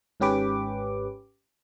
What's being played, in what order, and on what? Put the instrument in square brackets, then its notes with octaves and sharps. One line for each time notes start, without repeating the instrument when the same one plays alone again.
[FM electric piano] G#1 G#2 C#4 G4 B4 D6